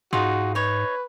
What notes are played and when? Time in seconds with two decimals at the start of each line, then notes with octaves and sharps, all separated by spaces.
0.13 G#2 D#4 F4 F#4 G#4
0.55 D#4 B4 C#5